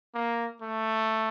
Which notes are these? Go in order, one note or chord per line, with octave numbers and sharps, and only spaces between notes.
A#3
A3